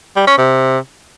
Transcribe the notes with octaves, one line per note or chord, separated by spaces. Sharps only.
G3
C#4
C3